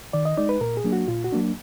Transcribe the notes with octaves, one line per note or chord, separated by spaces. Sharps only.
D#3 D5
D#5
G#3 D#4 D5
B4
A#2 A#4
G#4
F#3 A#3 D4
F#4
A#2 F4
F#4
F#3 A#3 D4